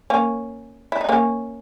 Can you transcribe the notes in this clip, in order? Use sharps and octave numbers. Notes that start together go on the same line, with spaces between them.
A#3 C#4
E4
D#4
A#3 C#4